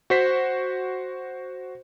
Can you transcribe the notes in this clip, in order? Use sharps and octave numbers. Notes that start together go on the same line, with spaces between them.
F#4 C5 B6